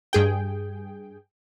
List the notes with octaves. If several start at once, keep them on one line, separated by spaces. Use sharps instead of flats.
G2 G#4 G5